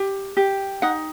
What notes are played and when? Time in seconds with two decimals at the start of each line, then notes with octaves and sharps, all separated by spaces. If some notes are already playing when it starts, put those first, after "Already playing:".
Already playing: G4
0.37 G4
0.82 D#4 F#5